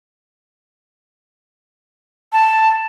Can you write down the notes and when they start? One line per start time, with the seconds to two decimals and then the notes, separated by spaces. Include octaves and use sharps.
2.33 A5